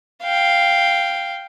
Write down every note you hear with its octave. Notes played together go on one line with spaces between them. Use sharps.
F5 G5